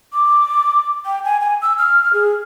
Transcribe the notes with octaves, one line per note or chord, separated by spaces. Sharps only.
D6
G5
G#5
G#5
E6
F6
G#4